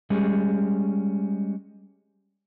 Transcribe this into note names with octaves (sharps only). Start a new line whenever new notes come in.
G3 G#3 C#4